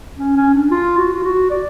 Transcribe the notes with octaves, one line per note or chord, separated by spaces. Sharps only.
C#4
C#4
D4
F4
F#4
F4
F#4
D5